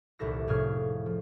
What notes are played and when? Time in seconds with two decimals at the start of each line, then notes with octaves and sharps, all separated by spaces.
0.19 D#1 C2 E4 A4 A#6
0.47 F1 A2 G#4 C#5 F6 G#6
1.06 F3